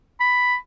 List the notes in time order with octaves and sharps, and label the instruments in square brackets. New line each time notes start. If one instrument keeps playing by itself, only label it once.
[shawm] B5